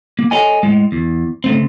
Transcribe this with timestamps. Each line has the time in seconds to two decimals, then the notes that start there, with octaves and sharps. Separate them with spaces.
0.19 A#3
0.31 A4 C#5 D#5 G#5
0.63 A2 G#3
0.92 E2
1.44 C#3 A3 C4